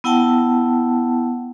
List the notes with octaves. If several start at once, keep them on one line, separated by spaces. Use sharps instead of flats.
B3 E4 F#5 G5 A5